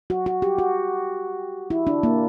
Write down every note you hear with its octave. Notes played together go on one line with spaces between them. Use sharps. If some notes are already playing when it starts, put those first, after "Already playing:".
F#4
F#4
G4
F#4
E4
D4
A#3